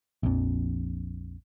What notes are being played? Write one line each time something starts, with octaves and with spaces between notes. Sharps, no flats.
A#1 F2